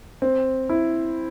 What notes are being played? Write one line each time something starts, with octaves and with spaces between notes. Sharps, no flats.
C4
E4